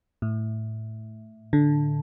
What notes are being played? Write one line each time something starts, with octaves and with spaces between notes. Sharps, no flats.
A2
D3